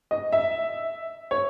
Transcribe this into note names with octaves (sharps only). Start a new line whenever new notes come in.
D#5
E5
C#5